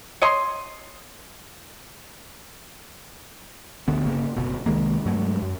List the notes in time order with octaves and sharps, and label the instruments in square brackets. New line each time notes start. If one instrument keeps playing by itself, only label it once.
[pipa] C#5 D#5 C6
[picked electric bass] D2 D3 B3
G1 C#3 A#3
F#1 B2
C2 D#3 G#3 A#3
G2 F#3 G#3 A3
F#2